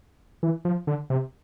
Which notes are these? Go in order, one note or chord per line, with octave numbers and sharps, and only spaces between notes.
E3
F3
D3
C3